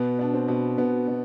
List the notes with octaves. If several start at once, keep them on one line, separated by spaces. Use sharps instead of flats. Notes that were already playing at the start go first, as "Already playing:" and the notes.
Already playing: B2 B3
B2 D4
C4
B2
B2 B3
B2